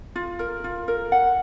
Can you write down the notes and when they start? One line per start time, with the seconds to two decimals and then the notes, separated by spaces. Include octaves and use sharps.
0.16 F4
0.39 A#4
0.64 F4
0.88 A#4
1.12 F#5